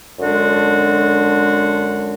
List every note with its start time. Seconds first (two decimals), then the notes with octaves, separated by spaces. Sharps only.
0.18 F#2 D3 G#3 D4 F#4